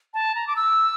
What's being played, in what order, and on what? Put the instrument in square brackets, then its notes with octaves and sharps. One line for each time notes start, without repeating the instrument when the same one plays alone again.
[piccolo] A5
A#5
D6
E6